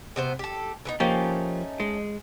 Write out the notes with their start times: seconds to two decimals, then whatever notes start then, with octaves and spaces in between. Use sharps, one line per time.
0.16 C3 B3 C5
0.39 G4 A4
0.85 D3 B3 D#4
1.00 F3 A3 A#3 C#4 D#4 G4
1.80 G#3